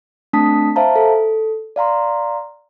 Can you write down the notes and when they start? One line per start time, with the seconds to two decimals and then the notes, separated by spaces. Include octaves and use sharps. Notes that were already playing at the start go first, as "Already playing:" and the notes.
0.33 A3 C4 D4 A5 D#6 B6
0.76 C5 E5 F5 A5 A#5
0.96 A4
1.76 D5 F5 A#5 C6